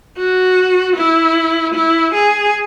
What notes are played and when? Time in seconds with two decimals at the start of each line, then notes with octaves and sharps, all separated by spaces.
0.18 F#4
0.96 E4
1.75 E4
2.14 G#4